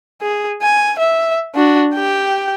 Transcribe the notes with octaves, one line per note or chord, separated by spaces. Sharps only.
G#4
G#5
E5
D4 F#4
G4 G5